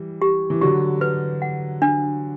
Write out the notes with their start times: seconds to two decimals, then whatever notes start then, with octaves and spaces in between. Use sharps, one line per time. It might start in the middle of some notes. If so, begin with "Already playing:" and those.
Already playing: E3 G3
0.22 G4
0.50 E3
0.61 D3 F#3 G4
1.01 B4
1.42 F#5
1.82 D4